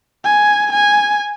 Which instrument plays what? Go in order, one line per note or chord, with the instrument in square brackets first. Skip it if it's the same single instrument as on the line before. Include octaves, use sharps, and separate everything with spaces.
[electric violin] G#5
G#5